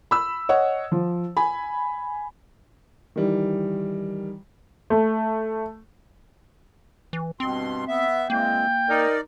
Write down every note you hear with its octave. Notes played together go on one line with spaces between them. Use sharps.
B5 E6
C#5 D#5 F#5
F3
G#5 B5
D#3 E3 G3
A3
E3
G2 B2 C4 C6
B3 E5
E3 G#3 A#3 C4 G5
D#4 A#4 D5